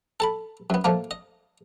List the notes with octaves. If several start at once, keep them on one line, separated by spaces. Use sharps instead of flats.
A4 A5 B5
F#2 B3
A#2 F3 A3 A#3
D#5